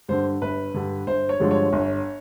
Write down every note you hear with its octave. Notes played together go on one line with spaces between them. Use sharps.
G2 D3 C5
G1 B4
G2 D3
G1 C5
C#5
G2 D3 F3 G#3
C#5
G1